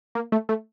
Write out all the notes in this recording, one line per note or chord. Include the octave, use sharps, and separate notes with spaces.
A#3
A3
A3